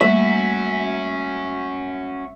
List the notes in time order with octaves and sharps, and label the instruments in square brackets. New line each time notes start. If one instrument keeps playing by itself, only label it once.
[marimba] G3 A3 A#3 [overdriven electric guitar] C#4 F#4 [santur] E5